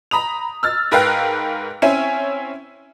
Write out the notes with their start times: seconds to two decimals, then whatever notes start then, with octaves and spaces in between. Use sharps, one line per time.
0.11 A#5 B5 D#6 F7
0.63 E6 F6 A6
0.91 G#2 A#4 B4 F5 G5 F#6
1.82 C4 C#4 E4 E5 G#5